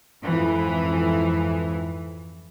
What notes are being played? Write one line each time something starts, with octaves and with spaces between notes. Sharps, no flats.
F2 G#2 E3